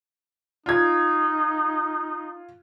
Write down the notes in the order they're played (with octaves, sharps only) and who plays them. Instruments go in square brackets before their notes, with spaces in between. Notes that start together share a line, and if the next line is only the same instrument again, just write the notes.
[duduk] D#4 [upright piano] F4 G#6